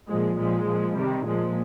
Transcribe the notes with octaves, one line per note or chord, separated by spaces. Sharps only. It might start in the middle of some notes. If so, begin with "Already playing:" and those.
A#2 F3 G#3
A#2 F3 G#3
A#2 F3
C3 D#3 G3
A#2 F3 G#3